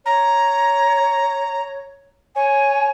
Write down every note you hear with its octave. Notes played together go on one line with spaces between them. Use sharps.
C#5 A#5
C#5 G#5